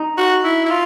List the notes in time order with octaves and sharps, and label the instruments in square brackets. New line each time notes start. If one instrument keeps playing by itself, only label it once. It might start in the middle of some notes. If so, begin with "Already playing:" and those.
Already playing: [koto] D#4
[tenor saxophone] F#4
E4
E4
F4